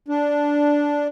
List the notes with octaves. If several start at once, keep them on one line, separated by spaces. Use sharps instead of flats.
D4